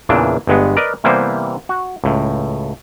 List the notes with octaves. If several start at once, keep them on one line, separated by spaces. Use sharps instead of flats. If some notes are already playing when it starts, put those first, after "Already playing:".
E2 A#2 C#3 E3 D4
G1 G2 G#3 B3
A#4 B4 D5 D#5
C3 E3 G3 A#3 B3 C5
F#4
C#2 A2